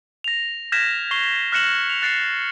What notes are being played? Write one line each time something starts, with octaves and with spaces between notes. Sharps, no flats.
A#6 F7
F6 G6 G#6 A#6 B6 E7
C#6 C7 G7
F6 F#6 A#6 C#7 E7 F#7
F7
F#6 A6 C7 C#7